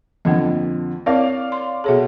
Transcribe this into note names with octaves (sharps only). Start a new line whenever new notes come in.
F2 D3 A#3 D4 D#5
C4 E4 A#4 C#5 D5 F5
C6
B2 G#4 A4 C#5 E5